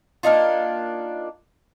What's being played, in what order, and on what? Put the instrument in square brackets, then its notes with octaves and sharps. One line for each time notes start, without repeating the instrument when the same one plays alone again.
[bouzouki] A#3 D4 D#4 F4